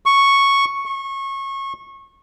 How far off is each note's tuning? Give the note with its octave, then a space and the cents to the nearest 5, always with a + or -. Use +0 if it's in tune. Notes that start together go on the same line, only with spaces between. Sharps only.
C#6 +0
C#6 -25